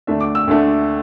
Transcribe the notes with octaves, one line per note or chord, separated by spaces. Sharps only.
D2 D3 A3 D4 E5
D6
E6
D2 D3 A3 D4